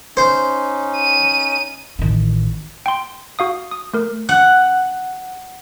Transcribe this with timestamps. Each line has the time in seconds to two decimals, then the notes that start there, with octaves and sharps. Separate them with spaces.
0.17 C#4 D#4 C5
0.97 D#7
1.99 A1 D#3
2.86 G5 C6
3.39 F#4 F5 D#6
3.71 D#6
3.94 A3 A#4
4.29 F#5